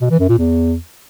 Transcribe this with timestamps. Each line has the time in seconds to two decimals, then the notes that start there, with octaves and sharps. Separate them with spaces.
0.01 B2
0.10 E3
0.20 F#2
0.29 A#2
0.38 E2